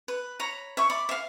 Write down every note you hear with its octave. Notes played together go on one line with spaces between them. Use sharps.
B4
C#5 A#5 B5
E5 C#6
D5 B5
E5 F5